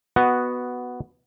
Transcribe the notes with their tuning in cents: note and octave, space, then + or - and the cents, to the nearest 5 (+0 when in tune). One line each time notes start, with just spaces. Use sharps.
B3 +0 F#4 +0 D#5 +0